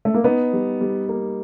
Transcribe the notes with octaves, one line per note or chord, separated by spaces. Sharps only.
A3
A#3
B3 D#4
G3
G3
A#3